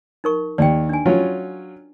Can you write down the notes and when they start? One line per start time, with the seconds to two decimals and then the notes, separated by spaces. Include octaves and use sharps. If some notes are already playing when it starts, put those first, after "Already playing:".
0.24 D#4 A#4 C#6
0.58 D#2 D5 G5
0.89 D4 G#5
1.06 F#3 C#4 F4